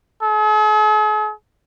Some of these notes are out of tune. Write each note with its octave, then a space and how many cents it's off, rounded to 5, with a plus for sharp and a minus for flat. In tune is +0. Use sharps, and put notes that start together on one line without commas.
G#4 +45